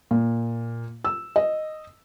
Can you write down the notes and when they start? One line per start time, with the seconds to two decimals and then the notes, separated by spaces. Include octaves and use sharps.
0.11 A#2
1.05 E6
1.36 D#5